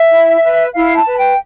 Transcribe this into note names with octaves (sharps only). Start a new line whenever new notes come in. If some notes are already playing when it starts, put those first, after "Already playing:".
Already playing: E5
E4
B4
E4 F5
A5
B4
G5